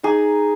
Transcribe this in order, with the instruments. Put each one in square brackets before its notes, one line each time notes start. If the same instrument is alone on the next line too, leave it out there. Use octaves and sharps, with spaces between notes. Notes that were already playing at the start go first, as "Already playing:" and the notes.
[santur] D#4 G#4